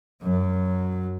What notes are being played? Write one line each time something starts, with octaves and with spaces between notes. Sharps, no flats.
F#2 F#3